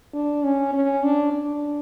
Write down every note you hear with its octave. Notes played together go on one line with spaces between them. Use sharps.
D4
C#4
C#4
D4
D4